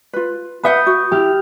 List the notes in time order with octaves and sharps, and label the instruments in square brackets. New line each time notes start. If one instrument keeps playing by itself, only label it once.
[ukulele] F4 B4
[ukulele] B4 E5 F#5 [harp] B5 D#6 G6
[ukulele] F#4
[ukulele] E4 [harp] G4 F6